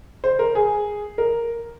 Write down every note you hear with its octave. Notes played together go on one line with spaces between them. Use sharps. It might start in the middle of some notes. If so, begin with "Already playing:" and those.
C5
A#4
G#4
A#4